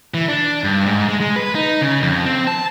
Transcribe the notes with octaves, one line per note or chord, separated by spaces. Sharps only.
E3
D4
G2
G#2
G#3
G#3
B4
D#4
C#3
F2
C4
A5